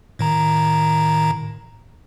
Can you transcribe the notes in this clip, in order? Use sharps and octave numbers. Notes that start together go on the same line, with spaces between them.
A2 D#3 A#5